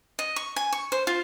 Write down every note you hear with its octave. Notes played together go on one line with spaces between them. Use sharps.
D#5
C#6
G#5
C#6
C5
F4